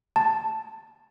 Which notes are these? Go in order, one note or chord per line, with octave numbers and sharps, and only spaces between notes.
A5